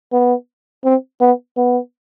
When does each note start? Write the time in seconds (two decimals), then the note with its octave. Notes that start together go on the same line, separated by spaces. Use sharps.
0.12 B3
0.85 C4
1.21 B3
1.57 B3